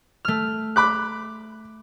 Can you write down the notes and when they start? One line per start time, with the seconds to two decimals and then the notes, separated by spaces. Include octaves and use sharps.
0.25 A3 F6
0.76 B5 D6 F#6